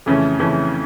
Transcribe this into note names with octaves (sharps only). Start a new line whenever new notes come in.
F2 C#3 E3 A3 C#4
F2 C#3 E3 A3 C#4